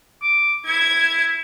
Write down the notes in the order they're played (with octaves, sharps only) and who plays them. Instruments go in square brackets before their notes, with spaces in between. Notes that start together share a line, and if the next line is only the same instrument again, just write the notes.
[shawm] D6
[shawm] E4 [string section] G#6